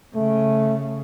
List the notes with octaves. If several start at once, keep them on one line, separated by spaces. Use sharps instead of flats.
C#3 A3